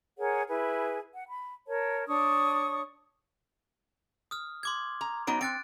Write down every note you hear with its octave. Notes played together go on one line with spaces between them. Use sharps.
G#4 A#4 C#5 F#5
E4 G#4 B4
F#5
B5
A#4 C#5 A5
D4 C#5 C#6 D#6
D#6 F6
C6 D6 G#6
A#5
F#3 B3 D#4 D7
C4 F#6 A6 D7